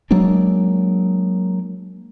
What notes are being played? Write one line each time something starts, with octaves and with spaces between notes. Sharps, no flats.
F#3 G#3 A#3 D4